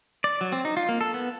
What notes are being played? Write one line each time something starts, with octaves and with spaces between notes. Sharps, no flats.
D5
F#3
C4
D#4
F4
A#3
A4
B3